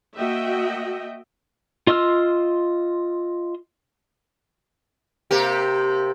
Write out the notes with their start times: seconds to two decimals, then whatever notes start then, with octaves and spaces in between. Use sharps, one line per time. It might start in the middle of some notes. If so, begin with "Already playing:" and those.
0.17 A#3 F#4 D#5 E5 G5
1.87 F4 D#5 C6 E6 F6
5.31 C3 A#3 G4